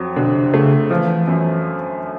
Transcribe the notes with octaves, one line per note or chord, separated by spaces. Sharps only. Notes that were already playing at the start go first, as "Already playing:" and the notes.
Already playing: F2 F#3
B2 D3
C3
C#3 A3
E3 F3
F#2